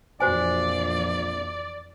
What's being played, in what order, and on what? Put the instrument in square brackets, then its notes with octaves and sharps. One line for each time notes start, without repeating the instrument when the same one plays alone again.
[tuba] A#1 [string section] F2 E3 [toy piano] F#4 C5 G#5 [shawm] D5